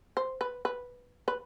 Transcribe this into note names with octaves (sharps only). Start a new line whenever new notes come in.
C5
B4
B4
B4